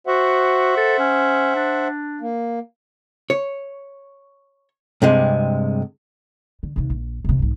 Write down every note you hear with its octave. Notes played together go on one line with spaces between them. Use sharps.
F#4 C5 E5 F#5
A4
C#4
D4
A#3
C#5
G2 C3 G#3
D3
D#2 C3
A#1
E1 C3
B1 G#2